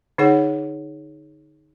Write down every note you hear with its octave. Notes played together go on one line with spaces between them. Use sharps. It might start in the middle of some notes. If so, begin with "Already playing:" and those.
D3 D#4 G#4 C#5 F#5